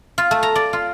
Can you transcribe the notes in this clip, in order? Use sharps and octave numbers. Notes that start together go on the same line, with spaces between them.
F4
A3
A#5
D5
F4